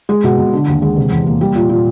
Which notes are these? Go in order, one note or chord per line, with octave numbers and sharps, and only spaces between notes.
G#3
B2
B2
D3
D#2
G#3
C3
E2
A#3
G3
A#2
A#2